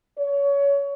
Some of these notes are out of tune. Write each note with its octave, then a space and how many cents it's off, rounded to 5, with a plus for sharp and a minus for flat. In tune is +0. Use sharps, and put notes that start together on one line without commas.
C#5 +25